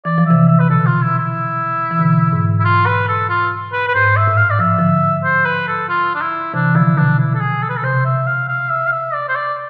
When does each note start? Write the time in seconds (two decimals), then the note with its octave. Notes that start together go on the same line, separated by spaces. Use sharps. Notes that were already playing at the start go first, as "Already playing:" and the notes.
0.05 E3 D5
0.18 F3
0.27 C3 E3 E5
0.48 E5
0.60 B4
0.70 B2 D3 A4
0.87 F4
1.03 E4
1.18 E4
1.91 E3
1.99 B2 D3
2.32 G#2
2.60 E4
2.65 F4
2.86 B4
3.08 A4
3.29 F4
3.73 B4
3.88 B4
3.94 G#2 C5
4.16 E5
4.28 A2
4.38 F5
4.51 D5
4.59 F3 E5
4.79 D3 F3
5.24 C5
5.45 B4
5.68 A4
5.89 F4
6.15 D4
6.21 E4
6.54 C3 E3 D4
6.75 D3 F3 E4
6.97 B2 D3 D4
7.19 E4
7.35 A4
7.41 G#4
7.62 A4
7.69 B4
7.77 A4
7.83 C3 C5
8.05 E5
8.27 F5
8.49 F5
8.70 E5
8.87 F5
8.92 E5
9.14 D5
9.29 C5
9.35 D5